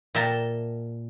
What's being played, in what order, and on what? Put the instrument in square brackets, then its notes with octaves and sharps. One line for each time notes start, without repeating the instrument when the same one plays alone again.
[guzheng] A#2 E5 G5 A5 A#5